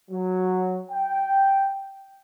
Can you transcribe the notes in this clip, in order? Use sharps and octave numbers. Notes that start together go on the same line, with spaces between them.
F#3
G5